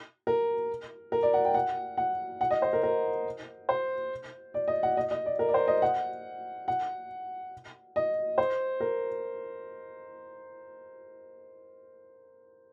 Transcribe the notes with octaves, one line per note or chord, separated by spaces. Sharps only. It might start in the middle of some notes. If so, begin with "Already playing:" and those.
A#4
A#4
D5
F#5
G5
F#5
F#5
F#5
D#5
C5
A#4
A#4
C5
D5
D#5
F#5
D#5
D#5
D5
A#4
D5
C5
D#5
F#5
F#5
D#5
C5
A#4